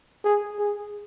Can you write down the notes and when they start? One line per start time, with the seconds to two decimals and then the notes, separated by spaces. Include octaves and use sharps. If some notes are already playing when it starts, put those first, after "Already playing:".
0.24 G#4
0.59 G#4